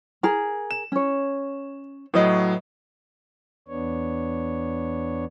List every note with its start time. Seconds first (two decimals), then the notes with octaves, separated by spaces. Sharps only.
0.23 G#4 A#4 A#5
0.71 E7
0.92 C#4 C#5
2.14 A2 F#3 B4 D#5
3.68 E2 B3 D4 C#5